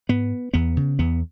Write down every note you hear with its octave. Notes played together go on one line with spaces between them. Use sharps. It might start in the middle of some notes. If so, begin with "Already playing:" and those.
G#2 B3
E2 B3
C#3
E2 B3